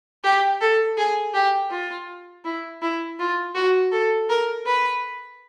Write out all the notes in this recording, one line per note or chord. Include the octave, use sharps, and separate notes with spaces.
G4
A4
G#4
G4
F4
E4
E4
F4
F#4
A4
A#4
B4